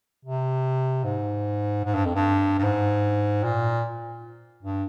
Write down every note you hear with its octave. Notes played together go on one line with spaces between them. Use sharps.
C3
G#2
G#2
G2
F2
G2
G2
G#2
A#2
G2